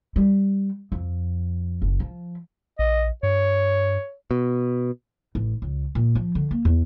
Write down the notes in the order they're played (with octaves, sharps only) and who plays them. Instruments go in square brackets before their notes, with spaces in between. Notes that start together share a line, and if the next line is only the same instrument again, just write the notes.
[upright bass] G3
F2
F#1
F3
[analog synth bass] A#1 [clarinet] D#5
[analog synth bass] G2 [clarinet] C#5
[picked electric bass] B2
[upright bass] A1
C#2
A#2
F3
D3
A#3
E2